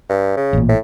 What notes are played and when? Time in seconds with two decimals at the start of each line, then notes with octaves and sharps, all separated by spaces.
0.09 G2
0.37 C#3
0.53 A1 A#2
0.69 A2